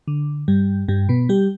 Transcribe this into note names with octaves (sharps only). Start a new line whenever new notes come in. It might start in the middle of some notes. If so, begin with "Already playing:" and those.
D3
G2 G3
G2 G3
B2 B3
G3 G4